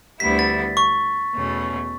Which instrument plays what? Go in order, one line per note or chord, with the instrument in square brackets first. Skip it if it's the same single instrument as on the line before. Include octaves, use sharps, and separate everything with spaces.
[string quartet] D2 D3 G3 B3 E4 [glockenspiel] B6
[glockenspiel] A6
C#6
[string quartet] E2 B2 A3 C#4